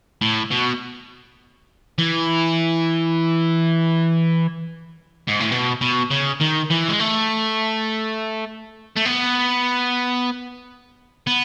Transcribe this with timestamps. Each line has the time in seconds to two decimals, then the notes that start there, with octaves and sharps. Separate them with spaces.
0.21 A2
0.51 B2
1.98 E3
5.28 G#2
5.40 A2
5.52 B2
5.81 B2
6.11 C#3
6.40 D#3
6.70 E3
6.88 G#3
7.00 A3
8.97 A3
9.06 B3
11.27 B3